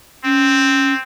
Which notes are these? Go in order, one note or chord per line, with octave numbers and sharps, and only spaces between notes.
C4 C#4